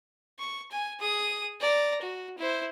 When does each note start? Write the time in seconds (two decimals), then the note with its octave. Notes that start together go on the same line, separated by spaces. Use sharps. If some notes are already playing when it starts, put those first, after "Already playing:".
0.39 C#6
0.71 G#5
1.00 G#4 D#6
1.61 D5 A#5
2.01 F#4
2.38 E4 C5